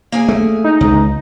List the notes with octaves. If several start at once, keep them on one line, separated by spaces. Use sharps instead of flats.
A#3 G#4 G#5
A3
D#4
C#2